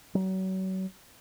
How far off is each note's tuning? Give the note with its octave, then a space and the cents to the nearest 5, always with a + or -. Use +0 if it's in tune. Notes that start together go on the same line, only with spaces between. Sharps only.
F#3 +35